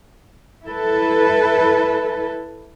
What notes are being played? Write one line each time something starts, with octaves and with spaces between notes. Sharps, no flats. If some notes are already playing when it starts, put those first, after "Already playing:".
E4 A4 B4